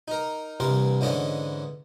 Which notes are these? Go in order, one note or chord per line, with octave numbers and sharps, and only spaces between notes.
D#4 A#4
C2 G2 E3 A#4 C6 D6
G#2 D3 E3 C#4 D4 D#5